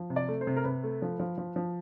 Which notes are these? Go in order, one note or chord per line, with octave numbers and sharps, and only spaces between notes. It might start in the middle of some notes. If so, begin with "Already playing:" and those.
Already playing: F3
C3
D5
A3
C5
C3
A#4
C3 B4
A3
F3
F3
F3
F3